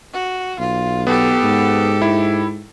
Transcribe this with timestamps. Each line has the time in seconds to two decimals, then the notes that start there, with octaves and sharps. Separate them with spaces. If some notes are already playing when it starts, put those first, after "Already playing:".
0.13 F#4
0.59 B1 F4
1.07 B3 G4 A4
1.44 G#2
2.02 E4